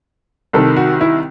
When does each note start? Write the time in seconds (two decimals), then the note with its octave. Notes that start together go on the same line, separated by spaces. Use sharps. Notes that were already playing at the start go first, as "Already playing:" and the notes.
0.53 C2 C3 D#3 A4
0.76 F#4
1.01 E4